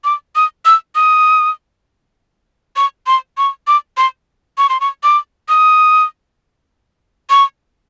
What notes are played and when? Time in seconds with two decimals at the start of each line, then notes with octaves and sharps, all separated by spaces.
0.04 D6
0.36 D#6
0.65 E6
0.95 D#6
2.76 C#6
3.07 C6
3.38 C#6
3.67 D6
3.97 C6
4.58 C#6
4.69 C6
4.81 C#6
5.03 D6
5.49 D#6
7.30 C#6